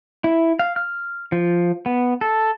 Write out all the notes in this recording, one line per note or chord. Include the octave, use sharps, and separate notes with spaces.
E4
F5
F6
F3
B3
A4